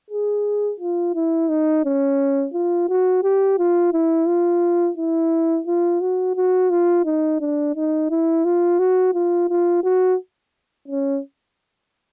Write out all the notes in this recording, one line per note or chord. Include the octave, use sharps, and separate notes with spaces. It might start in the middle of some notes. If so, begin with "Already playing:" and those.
G#4
F4
E4
D#4
C#4
F4
F#4
G4
F4
E4
F4
E4
F4
F#4
F#4
F4
D#4
D4
D#4
E4
F4
F#4
F4
F4
F#4
C#4